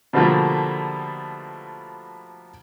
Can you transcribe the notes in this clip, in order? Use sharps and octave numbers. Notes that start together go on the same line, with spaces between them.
B2 D3 F3 G3 A3 A#3